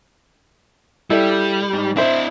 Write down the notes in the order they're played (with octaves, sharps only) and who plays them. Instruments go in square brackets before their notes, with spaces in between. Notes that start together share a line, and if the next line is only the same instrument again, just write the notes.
[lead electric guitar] G3 [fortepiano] E4 A4 D5
[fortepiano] G#2
[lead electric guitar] D4 E4 [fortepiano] C5 E5